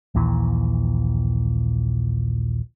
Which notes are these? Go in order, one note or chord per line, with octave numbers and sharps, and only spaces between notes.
A#1 D#2 A#2 E3